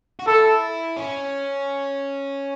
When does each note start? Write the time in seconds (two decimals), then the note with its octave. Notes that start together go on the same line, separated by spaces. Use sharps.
0.19 F#4
0.27 E4 A4
0.97 C#4